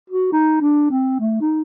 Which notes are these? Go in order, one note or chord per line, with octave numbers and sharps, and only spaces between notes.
F#4
D#4
D4
C4
A3
D#4